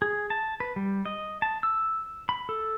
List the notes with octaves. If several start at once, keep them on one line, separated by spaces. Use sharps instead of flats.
G#4
A5
B4
G3
D#5
A5
E6
B5
A4